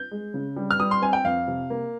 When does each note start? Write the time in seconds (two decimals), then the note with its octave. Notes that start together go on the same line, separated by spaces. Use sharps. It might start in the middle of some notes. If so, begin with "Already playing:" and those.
Already playing: G6
0.11 G#3
0.34 C#3
0.56 G3
0.71 F6
0.80 G3 D#6
0.91 C6
1.02 C4 G#5
1.13 G5
1.24 F2 F5
1.48 C3
1.70 A#3